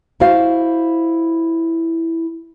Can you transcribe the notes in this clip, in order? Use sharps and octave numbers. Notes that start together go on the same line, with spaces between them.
E4 F#4 C5 F5